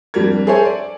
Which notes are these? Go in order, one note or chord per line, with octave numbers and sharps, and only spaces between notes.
F2 G3 D4 A#4 G#6
G#4 A4 C5 C#5 E5 G#5
D5